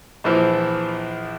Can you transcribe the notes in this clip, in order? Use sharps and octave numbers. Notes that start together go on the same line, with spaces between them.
A#1 E3 F3